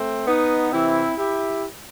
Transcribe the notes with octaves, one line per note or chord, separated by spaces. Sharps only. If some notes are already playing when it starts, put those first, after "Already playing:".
Already playing: A3 C4
B3 D#4
C3 E3 C4 E4
E4 G4